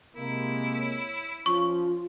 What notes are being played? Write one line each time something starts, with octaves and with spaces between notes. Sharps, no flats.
C3 G#3 A#3 E4
C#5
F3 C#4 F4 C#6